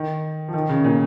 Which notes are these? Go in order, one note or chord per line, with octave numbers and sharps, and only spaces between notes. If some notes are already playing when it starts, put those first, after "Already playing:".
Already playing: D#3
F3
D#3
C#3
A#2